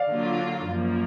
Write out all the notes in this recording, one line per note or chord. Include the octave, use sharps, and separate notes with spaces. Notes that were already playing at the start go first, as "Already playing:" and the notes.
Already playing: D5 F5
D3 F#3 A#3 F4
F#2 F3 A#3